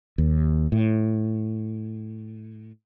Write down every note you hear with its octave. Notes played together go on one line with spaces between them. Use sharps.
D#2
A2